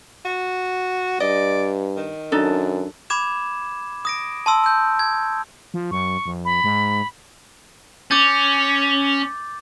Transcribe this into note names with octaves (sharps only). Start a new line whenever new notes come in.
F#4
G2 D5 D#5
D#3
F#2 D4 D#4 A4
B5 D6 G#6 E7
D#6 A#6 D7
A5 C6 E6
E6 G6
G#6
F3
F#2 C#6
F2
B5
G#2
C#4 D6 G6 A6